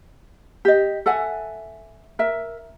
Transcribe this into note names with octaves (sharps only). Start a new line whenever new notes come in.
G4 D#5
A4 E5 F#5 G#5
A#4 E5